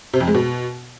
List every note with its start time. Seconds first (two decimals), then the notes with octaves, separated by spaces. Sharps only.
0.14 C3
0.21 F2
0.27 G#3
0.34 B2